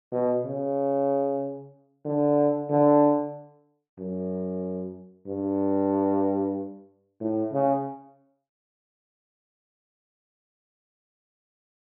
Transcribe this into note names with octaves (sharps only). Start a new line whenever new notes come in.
B2
C#3
D3
D3
F#2
G2
A2
C#3